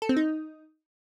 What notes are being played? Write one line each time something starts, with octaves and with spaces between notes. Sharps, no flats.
A4
C4
D#4